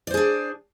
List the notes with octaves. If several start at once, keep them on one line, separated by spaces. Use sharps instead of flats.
D4 G#4 C5 D5